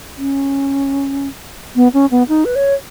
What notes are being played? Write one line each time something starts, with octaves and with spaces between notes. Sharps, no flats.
C#4
B3
C#4
B3
D#4
B4
C#5